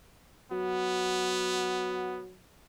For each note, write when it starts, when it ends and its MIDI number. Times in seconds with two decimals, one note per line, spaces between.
0.52 2.34 54
0.52 2.22 59